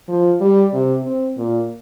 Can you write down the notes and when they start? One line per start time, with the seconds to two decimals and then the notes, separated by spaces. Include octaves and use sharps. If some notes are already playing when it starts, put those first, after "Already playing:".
0.09 F3
0.40 G3
0.73 C3
1.04 C4
1.37 A#2